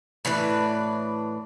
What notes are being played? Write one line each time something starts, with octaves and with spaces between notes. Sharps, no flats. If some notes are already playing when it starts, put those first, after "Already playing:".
A2 E3 D4 B4